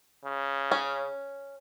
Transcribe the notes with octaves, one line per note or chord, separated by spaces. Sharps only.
C#3
C#4